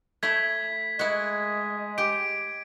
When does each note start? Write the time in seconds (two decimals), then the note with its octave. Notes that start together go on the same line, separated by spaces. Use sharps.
0.23 A3 E4 G#6 B6
0.99 G#3 E4 F#4 D#5
1.98 G4 D7